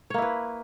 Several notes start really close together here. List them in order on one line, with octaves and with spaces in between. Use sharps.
C#5 A#3 E4 B4